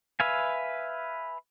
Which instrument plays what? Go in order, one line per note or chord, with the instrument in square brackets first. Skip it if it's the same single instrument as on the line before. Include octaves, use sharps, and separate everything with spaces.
[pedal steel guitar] B4 E5 F5 G#5